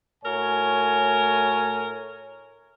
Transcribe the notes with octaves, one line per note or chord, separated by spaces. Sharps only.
A2 A3 F#4 A#4 C#5 G#5